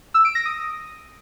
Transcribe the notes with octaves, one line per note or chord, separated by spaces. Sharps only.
E6
D7
A#6
D#6